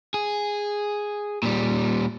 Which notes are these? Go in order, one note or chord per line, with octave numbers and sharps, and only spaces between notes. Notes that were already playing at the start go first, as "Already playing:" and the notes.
G#4
A#2 G3